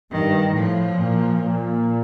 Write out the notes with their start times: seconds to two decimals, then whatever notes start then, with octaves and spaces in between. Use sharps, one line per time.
0.11 G2 D#3
0.54 A2 F3
0.97 A#2
1.41 A#2